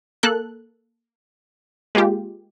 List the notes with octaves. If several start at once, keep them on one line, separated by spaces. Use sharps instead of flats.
A#3 A4 F#6
G#3 A#3 F4 G4